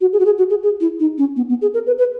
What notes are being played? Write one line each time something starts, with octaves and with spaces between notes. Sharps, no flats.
F#4
G#4
F#4
G#4
F#4
G#4
G#4
E4
D#4
C#4
B3
B3
G#4
A#4
B4
B4